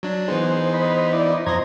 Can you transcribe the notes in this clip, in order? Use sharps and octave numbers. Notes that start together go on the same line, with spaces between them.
F#3 D4
E3 B3 D#4 G#4 C5
C5 D#5 B5
E4 D5
D#5
F2 C5 D#5 A#5 G#6